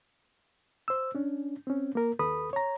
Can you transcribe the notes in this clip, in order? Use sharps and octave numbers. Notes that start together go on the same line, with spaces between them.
C5 E6
C#4 D4
C4 C#4
A#3 A#4
D#2 A4 B4 B5 D#6
C#5 A#5